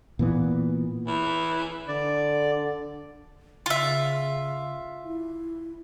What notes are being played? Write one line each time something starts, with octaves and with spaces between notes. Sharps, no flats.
A#2 E3 B3
E3
D3 D5
C#3 F4 E5
E4